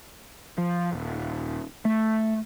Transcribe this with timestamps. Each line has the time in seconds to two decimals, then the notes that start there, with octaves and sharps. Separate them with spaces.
0.58 F3
0.93 D#1
1.85 A3